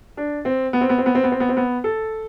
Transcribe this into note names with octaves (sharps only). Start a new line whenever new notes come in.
D4
C4
B3
C4
B3
C4
B3
C4
B3
C4
B3
C4
B3
A4